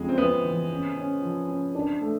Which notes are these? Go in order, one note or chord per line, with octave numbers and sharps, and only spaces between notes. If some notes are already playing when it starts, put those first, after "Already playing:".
Already playing: F2 C#3 G#3
C4
F2 B3
E3
C#4
C#4
F3
C#4
D4
A3